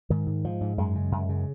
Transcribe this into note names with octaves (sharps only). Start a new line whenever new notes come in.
G#2 D#3
G#2
G#2 F3
G#2
F#2 G#3
C#3
F#2
C#3